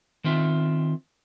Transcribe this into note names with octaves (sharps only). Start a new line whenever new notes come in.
D#3 C4 F4 E5